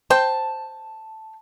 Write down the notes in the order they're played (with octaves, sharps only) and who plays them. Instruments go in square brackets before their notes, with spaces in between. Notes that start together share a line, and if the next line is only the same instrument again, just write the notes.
[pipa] C5 G5 [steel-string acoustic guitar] A5